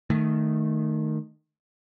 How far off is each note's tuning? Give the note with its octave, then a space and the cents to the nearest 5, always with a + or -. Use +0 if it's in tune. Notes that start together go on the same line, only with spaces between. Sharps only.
D#3 -15 A3 +0